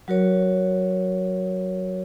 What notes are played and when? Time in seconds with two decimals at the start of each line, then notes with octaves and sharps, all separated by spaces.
0.08 F#3 F#4 A#4 C#5